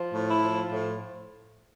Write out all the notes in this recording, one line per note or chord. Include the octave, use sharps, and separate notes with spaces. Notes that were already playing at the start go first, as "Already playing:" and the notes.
Already playing: F3
A2
E4
F3
A2